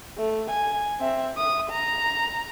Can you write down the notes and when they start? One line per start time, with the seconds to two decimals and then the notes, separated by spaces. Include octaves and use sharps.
0.18 A3
0.51 G#5
1.00 C4 E5
1.34 E5 D#6
1.70 A#5